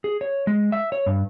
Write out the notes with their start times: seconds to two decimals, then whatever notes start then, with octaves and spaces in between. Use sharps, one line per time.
0.04 G#4
0.21 C#5
0.47 G#3
0.72 E5
0.92 C#5
1.06 G2